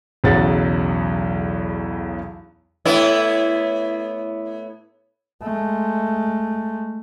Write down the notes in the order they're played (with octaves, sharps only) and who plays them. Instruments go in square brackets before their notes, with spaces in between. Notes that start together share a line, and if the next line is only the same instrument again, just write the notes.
[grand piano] B1 E2 C#3 F#3 F#5 A6
[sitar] A2 B3 E4
[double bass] G#3 A3